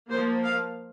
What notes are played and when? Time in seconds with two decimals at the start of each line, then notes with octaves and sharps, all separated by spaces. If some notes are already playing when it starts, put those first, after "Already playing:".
0.11 F3 A#3 C5
0.44 F5